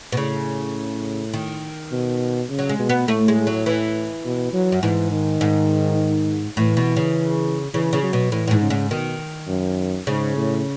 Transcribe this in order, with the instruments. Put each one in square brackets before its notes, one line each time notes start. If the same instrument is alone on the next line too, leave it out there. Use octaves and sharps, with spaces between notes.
[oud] B2
[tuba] A2 [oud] C#3
[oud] D#3
[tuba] B2
C#3
[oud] F#3
G#3
[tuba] B2
[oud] B3
[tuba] A2 [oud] A3
[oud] G#3
F#3
E3
[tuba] B2
F#3
[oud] F#2
[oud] G#2 [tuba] E3
[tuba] D#3
[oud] G#2
[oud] A2 [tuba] E3
[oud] B2
C#3
[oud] C#3 [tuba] E3
[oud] C#3
[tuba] F#3
[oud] B2
[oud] A2 [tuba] E3
[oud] A2
G#2
[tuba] C#3
[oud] G#2
[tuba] B2 [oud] D#3
[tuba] F#2
[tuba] G#2 [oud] C#3
[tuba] A2